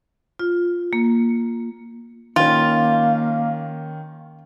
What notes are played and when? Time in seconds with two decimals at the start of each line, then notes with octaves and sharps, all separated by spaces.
0.39 F4
0.93 A#3
2.36 D#3 A#3 C#4 F4